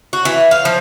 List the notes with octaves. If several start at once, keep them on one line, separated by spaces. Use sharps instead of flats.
F#4
E3
F5
F3